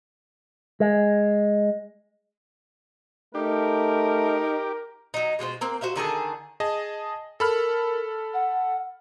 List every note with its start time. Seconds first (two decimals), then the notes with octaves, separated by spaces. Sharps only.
0.80 G#3
3.35 A3 D#4 G4 A#4
5.14 F#3 D#4
5.39 B2 G#3 F4 C5
5.61 A#3 C4
5.81 F#4 C5 E5 F5
5.96 D3 D#3 G#4 A4
6.60 G#4 D#5 A5
7.40 A4 A#4 B5 F6
8.34 F#5